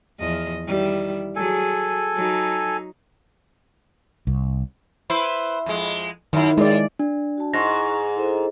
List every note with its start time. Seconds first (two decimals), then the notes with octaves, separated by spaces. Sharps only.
0.19 E2 F3 D#5
0.65 D#3 G3 E4
1.36 F#3 G#4 A4 G#5
2.14 F#3 D#4
4.27 C2
5.10 E4 B4 C5
5.66 F2 G#3
6.33 F#2 D#3 E4
6.57 A2 G#3 D5
6.99 D4
7.38 F#4 A5
7.54 G#2 E4 C6 C#6 A#6
8.16 E4 A4 C5